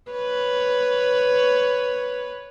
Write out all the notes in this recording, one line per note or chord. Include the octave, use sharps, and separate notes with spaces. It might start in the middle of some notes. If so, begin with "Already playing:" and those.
B4 C#5